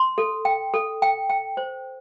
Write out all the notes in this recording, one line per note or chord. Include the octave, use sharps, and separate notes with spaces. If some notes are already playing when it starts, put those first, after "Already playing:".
Already playing: C6
A4
G5
A4
G5
G5
C5